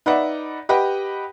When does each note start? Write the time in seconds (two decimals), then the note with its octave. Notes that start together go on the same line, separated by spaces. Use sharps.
0.06 D#4 B4 D5 E5 F#5
0.69 G4 B4 D#5 F#5 G5